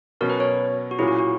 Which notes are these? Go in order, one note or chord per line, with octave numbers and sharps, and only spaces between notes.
B2 F#3 C#4 A#4
B4
C#5
F#4
A#2 F#3 C#4 E4 G#4
F#4
F#4